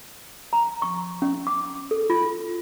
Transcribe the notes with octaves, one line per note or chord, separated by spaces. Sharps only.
A#5
C#6
C#4
D6
A4
F4